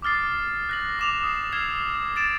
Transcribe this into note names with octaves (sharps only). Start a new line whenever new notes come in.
D6 D#6 F6 A6 C7
F#6 A#6 F#7
D6 E7 F7
D#6 C7
E6 F6 G#6 C7
A6 D7 E7